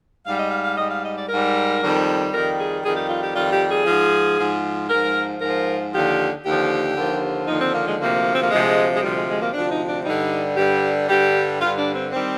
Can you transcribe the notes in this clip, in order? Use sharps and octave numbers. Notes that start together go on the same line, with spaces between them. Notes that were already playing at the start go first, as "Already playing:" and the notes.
G#2 G3 F5
D#5
F5
F5
G#2 G3 D#5
F5
D#5
D5
G#2 G3 A#4
F2 D#3 G3
F2 D#3 G3 A#4
G#4
F2 D#3 G3 G#4
G4
F4
G4
F2 D#3 G3 F4
G4
G#4
G#2 F3
G#2 F3
G#2 F3 A#4
G#2 A#4
F3
D#2 D3 F3 G4
D#2 D3 F3 G4
D#2 D3 F3
D#2 D3 F3 D#4
C4
A#3
G#3
D2 C3 F3 A#3
C4
A#3
D2 C3 F3 G#3
G#3
D2 C3 F3 G3
G#3
G#3
A#3
D2 C3 F3 D4
D#4
D4
G2 D3 G3 D#4
G2 D3 G3 G4
G2 D3 G3 G4
G2 D3 G3 F4
D4
C4
D#3 G3 C4